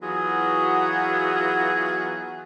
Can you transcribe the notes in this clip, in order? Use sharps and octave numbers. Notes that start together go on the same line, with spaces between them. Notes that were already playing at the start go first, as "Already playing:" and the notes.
E3 F#3 B3 F4 F#4 G#4